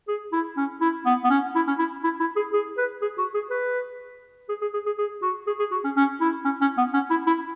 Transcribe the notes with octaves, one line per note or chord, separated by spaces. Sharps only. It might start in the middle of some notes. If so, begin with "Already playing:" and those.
G#4
E4
C#4
E4
B3
B3
C#4
E4
C#4
E4
E4
E4
G#4
G#4
B4
G#4
F#4
G#4
B4
G#4
G#4
G#4
G#4
G#4
F#4
G#4
G#4
F#4
C#4
C#4
E4
C#4
C#4
B3
C#4
E4
E4